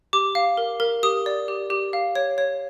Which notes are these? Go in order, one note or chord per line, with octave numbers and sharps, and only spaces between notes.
G4 D6
F5
A#4
A#4
G4 D#6
D5
G4
G4
F5
C#5
C#5